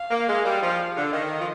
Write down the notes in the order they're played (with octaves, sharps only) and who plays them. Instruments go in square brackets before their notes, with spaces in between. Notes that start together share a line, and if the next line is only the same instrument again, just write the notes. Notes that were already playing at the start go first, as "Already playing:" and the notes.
Already playing: [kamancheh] F5
[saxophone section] A#3
G#3
G3
F3
D3
[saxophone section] D#3 [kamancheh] D#5
[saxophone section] F3